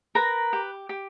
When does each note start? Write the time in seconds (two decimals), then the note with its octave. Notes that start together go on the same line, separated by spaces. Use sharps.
0.15 A#4 B4 A#5
0.53 G4
0.89 G4